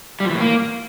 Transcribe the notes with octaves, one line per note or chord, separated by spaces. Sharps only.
G3
F3
E3
A2
A#3